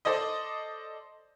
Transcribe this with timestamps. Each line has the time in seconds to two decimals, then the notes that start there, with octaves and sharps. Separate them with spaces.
0.05 A4 C5 D5 D#5